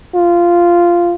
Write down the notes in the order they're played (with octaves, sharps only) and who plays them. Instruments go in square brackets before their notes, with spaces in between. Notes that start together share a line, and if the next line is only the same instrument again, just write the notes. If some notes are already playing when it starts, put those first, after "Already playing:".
[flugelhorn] F4